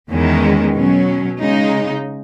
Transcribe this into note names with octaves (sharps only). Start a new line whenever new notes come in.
E2 D#3 G#3 C#4
B2 F#3 C#4
C#3 G#3 D#4